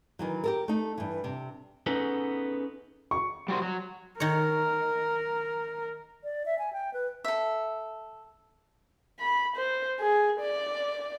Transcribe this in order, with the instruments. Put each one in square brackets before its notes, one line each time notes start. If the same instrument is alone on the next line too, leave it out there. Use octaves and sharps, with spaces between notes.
[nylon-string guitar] D#3 E3 F#3
G4 A4 A#4
A3 D#4
G2 E3
C3
[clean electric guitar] B3 C#4 D#4 G#4 A4 B4
[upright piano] C#6
[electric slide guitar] G3 F#4 C5
F#3
[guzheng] D#3 C#5 [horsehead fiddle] A#4
[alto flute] D5
E5
G#5
G5
B4
[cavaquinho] A4 E5
[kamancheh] B5
C5
G#4
D5